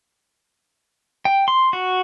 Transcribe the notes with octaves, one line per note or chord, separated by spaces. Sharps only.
G5
C6
F#4